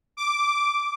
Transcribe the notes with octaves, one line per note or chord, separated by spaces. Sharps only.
D6